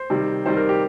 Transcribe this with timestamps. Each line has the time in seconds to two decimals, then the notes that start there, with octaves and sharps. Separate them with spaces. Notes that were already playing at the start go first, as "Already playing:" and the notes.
Already playing: C5
0.10 C3 D#3 G3
0.45 C3 D#3 G3 C5
0.57 A#4
0.69 G4